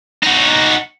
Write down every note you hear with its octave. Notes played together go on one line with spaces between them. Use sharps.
D#4 F#4